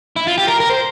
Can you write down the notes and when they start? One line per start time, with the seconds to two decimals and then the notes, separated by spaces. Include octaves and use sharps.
0.16 E4
0.27 F4
0.38 G4
0.48 A#4
0.60 A#4
0.70 C5